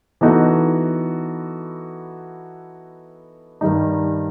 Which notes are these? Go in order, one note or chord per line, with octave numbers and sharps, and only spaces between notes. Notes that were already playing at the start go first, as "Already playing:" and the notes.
E3 B3 D#4 F#4 A4
G2 D#3 G3 D#4